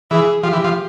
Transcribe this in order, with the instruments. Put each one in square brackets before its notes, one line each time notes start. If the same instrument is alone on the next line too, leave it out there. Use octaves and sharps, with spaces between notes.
[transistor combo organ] E3 [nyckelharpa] G#4
[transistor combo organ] F3 [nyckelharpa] G4
[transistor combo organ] E3
F3